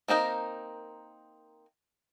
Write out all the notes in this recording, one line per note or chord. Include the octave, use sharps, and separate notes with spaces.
A#3 C4 D#4 A#4